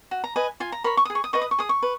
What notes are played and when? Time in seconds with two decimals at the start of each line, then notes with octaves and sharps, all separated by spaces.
0.11 F#4
0.24 A#5
0.36 B4 D#5 G#5
0.60 F4 G#5
0.72 A#5
0.84 A#4 C#5 B5
0.97 C#6
1.05 D#6
1.10 G#4
1.15 C#6
1.24 D#6
1.33 B4 D#5 C#6
1.42 D#6
1.51 C#6
1.59 G#4 D#6
1.69 C#6
1.83 B4